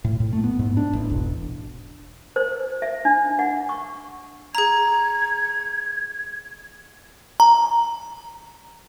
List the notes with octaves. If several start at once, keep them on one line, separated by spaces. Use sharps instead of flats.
A2
A2
A3
B3
G#2
D4
A1
E1
C5
E5
D4
F#5
C#6
G#4 A#5 G#6
A#5